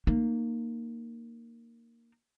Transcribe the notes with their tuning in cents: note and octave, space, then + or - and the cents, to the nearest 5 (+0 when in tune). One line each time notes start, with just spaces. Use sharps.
A#3 -5 D#4 -30